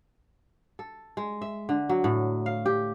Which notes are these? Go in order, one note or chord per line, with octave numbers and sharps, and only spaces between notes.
A4
G#3
E5
D3
F#3
A2
F5
G4